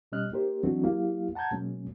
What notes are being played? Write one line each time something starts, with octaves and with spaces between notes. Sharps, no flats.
B2 G3 C#4 D#5 F6 F#6
A#3 D#4 G4 A#4 C5
E3 F#3 C4 D4 D#4 F#4
F#3 A#3 E4 G4 F5
F#5 A5 A#5 G6 G#6
B2 F#3 G#3 A#3 C#4